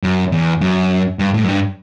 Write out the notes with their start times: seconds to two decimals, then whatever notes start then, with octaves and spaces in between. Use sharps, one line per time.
0.03 F#2
0.32 E2
0.61 F#2
1.19 G2
1.34 A2
1.44 F#2
1.48 G2